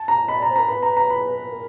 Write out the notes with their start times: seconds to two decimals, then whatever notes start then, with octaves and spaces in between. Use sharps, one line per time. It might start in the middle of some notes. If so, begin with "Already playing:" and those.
Already playing: A5
0.08 A#5
0.28 D#5 B5
0.38 D5
0.42 A#5
0.49 C5
0.56 A#4 A#5
0.69 B4 B5
0.83 A#5
0.97 A#5
1.10 B5
1.50 A#4